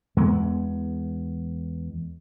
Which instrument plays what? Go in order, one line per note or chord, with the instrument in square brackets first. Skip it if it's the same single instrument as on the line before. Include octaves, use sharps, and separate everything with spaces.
[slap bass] E2 G#3 B3